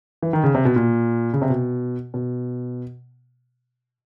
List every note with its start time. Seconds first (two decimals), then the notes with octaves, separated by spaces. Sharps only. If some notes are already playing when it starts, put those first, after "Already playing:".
0.22 E3
0.33 D#3
0.44 C#3
0.55 C3
0.65 B2
0.76 A#2
1.33 C#3
1.42 C3
1.50 B2
2.14 B2